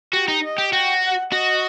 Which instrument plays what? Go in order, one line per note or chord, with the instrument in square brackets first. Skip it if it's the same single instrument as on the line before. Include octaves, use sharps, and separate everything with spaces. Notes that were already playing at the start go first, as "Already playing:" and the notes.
[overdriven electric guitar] F#4 [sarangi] G4
[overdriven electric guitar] D#4
[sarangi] D#5
[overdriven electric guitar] G4
[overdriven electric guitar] F#4 [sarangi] G5
[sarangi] F#5
[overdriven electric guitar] F#4 [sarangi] D#5